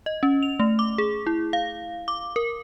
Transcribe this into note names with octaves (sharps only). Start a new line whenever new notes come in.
D#5
C#4
F7
A3
D6
G#4
E4
F5
D6
A#4